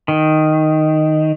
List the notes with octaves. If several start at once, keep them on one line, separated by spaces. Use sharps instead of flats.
D#3